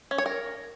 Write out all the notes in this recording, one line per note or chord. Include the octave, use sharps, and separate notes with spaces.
C#4
C#5
A#4